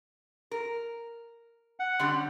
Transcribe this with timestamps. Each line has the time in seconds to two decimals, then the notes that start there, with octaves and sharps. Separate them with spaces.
0.51 A#4
1.80 F#5
1.99 D3 G3 C#4